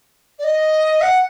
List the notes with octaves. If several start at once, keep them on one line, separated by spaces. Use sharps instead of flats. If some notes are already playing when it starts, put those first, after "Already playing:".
D5
D#5
F#5